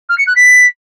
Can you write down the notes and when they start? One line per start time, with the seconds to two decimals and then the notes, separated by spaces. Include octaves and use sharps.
0.09 F6
0.18 C#7
0.27 F#6
0.36 B6